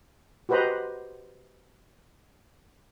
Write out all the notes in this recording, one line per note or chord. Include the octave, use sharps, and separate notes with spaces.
F#4 G4 B4 C5 D#5 A#5